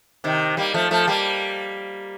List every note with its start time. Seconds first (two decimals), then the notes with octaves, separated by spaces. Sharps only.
0.24 C3 D#3
0.57 G3 A#3
0.74 F3 A3
0.91 F3 A3
1.07 G3 A#3